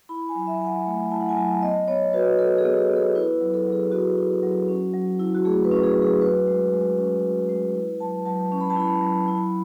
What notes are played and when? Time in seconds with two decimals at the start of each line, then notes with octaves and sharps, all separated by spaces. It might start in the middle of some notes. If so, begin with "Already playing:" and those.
0.09 E4 B5
0.29 G#5
0.35 F#3
0.47 E5
0.61 F#3 G#5
0.66 F#5
0.86 A3
1.11 E4 A5
1.21 F#5
1.29 G#5
1.37 F#3 A5
1.62 B3 D#5
1.88 B3 C#5
2.13 F#4 B4
2.39 F#4 A4
2.58 G#4
2.64 B3
2.77 G#4
2.91 B3
2.96 A4
3.15 E4 B4
3.41 F#3
3.54 A4
3.67 F#3
3.72 G#4
3.92 B3 F#4
4.18 E4
4.43 F#3
4.69 C#4
4.94 F#3
5.19 E4
5.35 F#4
5.45 A3 G#4
5.64 B4
5.71 C#4
5.83 G#4
5.97 F#3
6.02 G#4
6.21 F#4 B4
6.47 G#3
6.73 G#3
6.98 C#4
7.24 F#4
7.49 G#3
7.75 E4
8.00 F#3 A5
8.25 F#3 A5
8.52 C#4
8.61 B5
8.70 A5
8.77 E4 B5
9.02 F#3
9.28 E4